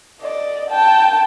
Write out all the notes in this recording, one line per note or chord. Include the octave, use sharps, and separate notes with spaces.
D5 D#5
G5 A5